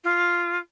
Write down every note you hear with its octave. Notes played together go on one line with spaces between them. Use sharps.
F4